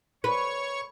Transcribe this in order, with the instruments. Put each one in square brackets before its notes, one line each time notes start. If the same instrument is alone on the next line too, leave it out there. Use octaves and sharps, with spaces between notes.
[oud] B4 [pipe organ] C#5 C#6